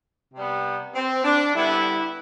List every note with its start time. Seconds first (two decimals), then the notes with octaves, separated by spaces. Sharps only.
0.34 C3 G3 B3
0.95 C4
1.24 D4
1.54 D3 G3 B3 E4